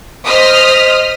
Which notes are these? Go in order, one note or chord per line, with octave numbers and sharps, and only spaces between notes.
C5 D#5 D#6 F6 B6